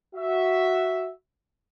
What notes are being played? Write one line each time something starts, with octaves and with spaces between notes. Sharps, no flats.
F#4 E5